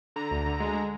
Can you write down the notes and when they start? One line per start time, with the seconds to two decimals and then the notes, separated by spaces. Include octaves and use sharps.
0.16 D3 A#5
0.31 D2
0.46 D3
0.60 G#3